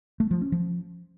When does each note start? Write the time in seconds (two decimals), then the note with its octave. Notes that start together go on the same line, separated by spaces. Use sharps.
0.20 A3
0.31 F3
0.41 C#4
0.52 F3